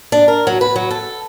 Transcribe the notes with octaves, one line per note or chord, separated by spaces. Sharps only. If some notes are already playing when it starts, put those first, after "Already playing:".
D4
A#4
F#3
B4
F#3
A4